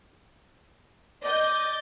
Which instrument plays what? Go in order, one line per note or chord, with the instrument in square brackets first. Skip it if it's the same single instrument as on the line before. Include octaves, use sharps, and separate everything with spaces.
[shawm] D5 [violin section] D#5 G6